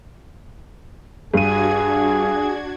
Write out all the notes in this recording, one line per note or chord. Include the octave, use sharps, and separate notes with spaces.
G2 D4 F#4 G#4 G#6 D#7